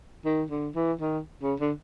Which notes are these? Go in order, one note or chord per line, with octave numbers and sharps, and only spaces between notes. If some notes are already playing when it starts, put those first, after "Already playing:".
D#3
D3
E3
D#3
C#3
D3